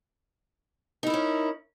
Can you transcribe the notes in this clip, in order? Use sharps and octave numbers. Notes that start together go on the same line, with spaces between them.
C#4 D#4 E4 A#4